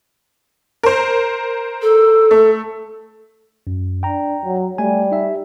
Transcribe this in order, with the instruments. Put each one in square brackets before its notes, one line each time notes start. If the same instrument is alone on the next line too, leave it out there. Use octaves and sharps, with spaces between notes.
[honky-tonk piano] A#4 C5
[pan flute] A4
[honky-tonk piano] A3
[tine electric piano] F#2
[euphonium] D4 [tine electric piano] G5 A#5
[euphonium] F#3
[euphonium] G3 [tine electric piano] A3 G#5
[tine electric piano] D#4 E5